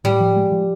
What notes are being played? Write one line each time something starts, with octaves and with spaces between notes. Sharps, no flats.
A2 G3
F3
G#3
F3